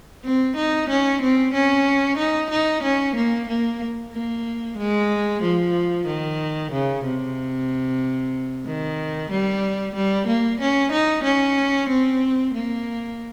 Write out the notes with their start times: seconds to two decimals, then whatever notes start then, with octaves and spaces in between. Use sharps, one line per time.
0.24 C4
0.56 D#4
0.89 C#4
1.21 C4
1.53 C#4
2.18 D#4
2.50 D#4
2.83 C#4
3.15 A#3
3.48 A#3
4.13 A#3
4.78 G#3
5.42 F3
6.06 D#3
6.71 C#3
7.04 C3
8.66 D#3
9.31 G3
9.95 G3
10.27 A#3
10.60 C#4
10.92 D#4
11.24 C#4
11.89 C4
12.53 A#3